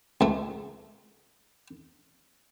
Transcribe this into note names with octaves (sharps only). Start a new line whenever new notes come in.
C#2 A3